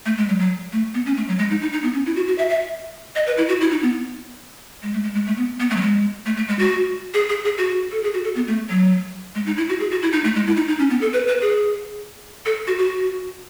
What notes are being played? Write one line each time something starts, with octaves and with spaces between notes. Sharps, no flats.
A3
G#3
F#3
F#3
A3
B3
C#4
A3
F#3
G#3
D#4
D#4
D#4
B3
C#4
E4
F#4
F#4
E5
E5
D#5
B4
E4
F#4
E4
D#4
B3
G#3
A3
G#3
G#3
A3
B3
B3
A3
F#3
G#3
A3
A3
G#3
F#4
G#4
G#4
G#4
F#4
A4
G#4
F#4
A4
B3
A3
F#3
G#3
D#4
E4
F#4
G#4
F#4
E4
D#4
A3
G#3
E4
D#4
D#4
C#4
B3
A4
B4
B4
G#4
A4
F#4
F#4